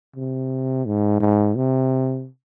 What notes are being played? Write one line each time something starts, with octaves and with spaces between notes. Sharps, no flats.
C3
G#2
G#2
C3